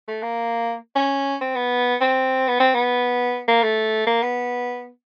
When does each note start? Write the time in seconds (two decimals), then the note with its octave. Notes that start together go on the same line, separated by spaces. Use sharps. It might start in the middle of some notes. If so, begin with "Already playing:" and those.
0.08 A3
0.22 A#3
0.96 C#4
1.41 C4
1.56 B3
2.01 C4
2.48 B3
2.60 C4
2.74 B3
3.48 A#3
3.63 A3
4.07 A#3
4.22 B3